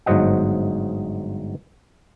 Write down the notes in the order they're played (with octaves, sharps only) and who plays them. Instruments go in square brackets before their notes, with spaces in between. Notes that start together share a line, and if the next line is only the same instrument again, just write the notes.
[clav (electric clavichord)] G1 G#2 F#3 C5 D#5 F#5